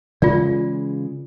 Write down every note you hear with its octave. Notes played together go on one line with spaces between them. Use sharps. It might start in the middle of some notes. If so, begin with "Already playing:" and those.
C#3 E3 G#3 F4 D5